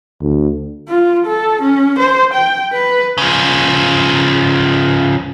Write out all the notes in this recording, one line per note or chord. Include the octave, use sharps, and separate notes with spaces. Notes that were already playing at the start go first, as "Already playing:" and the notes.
D2
F4
A4
C#4
C5
G5
B4
C#3 F3